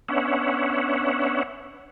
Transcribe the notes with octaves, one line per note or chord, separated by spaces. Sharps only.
B3 C#4 D4 C#5 E5 F#5